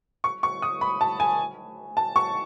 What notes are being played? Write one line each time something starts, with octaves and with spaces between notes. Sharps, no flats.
C#6
C#6
D#6
B5
A5
G#5
A5
C#6